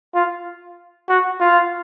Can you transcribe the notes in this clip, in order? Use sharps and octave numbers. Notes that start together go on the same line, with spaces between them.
F4
F#4
F4